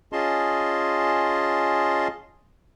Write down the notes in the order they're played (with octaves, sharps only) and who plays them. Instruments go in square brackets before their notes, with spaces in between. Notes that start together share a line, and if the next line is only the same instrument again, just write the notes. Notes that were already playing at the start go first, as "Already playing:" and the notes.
[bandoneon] C#4 F4 G#4 D#5 A5 C6